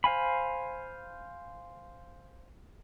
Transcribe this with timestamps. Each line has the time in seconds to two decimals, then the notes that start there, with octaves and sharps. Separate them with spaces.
0.04 C5 F5 G#5 B5